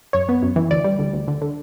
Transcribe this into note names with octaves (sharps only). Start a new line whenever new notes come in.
F#2 C#5
B3
F#2
E3
D2 D5
G3
D2
D2
D3
D3